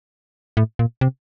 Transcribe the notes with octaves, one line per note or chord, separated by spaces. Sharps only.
A2
A#2
C3